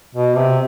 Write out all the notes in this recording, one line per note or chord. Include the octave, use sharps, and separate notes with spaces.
B2
C3